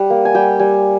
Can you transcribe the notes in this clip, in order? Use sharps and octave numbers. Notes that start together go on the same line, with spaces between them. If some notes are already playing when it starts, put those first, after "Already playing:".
Already playing: G3 F#5
A#3
G#5
G3 G5
G3 G#5